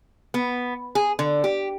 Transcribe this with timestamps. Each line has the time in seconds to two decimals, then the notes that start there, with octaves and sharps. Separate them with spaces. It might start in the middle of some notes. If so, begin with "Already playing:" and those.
0.34 B3
0.95 G#4
1.19 D3
1.44 G4